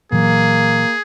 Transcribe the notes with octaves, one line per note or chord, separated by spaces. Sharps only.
A#2 E3 F#3 A#3 G#4